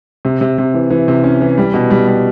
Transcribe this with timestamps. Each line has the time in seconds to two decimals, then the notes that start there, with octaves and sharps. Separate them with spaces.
0.25 C3
0.41 C3
0.58 C3
0.74 E3
0.90 E3
1.08 C3
1.24 C#4
1.41 E3
1.58 G3
1.74 B2
1.91 G3
2.07 G3